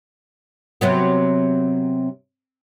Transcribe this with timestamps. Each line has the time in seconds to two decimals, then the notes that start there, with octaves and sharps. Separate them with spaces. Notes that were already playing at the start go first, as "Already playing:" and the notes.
0.81 C3 F#3 B3